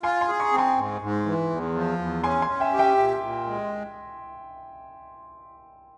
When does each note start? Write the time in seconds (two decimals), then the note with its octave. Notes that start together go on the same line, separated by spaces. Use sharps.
0.03 F4 G#5 C6
0.21 G#5 C6
0.28 G#4
0.40 A#5 C#6
0.52 C4
0.58 G#5 C6
0.77 G#2
1.01 G#2
1.26 E3
1.50 E2
1.74 F3
1.99 E2
2.24 C#4 G#5 C6
2.42 G#5 C6
2.48 C#4
2.60 E5 G5
2.73 G4
2.79 E5 G5
2.97 A#2
3.21 A#2
3.47 G#3